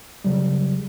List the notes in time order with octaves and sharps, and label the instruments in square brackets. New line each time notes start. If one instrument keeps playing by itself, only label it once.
[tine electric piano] C#3 F#3 G3